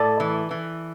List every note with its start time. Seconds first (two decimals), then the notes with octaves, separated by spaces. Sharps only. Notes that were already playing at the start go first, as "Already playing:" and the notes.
Already playing: A2 A4 D5
0.20 E3
0.51 E3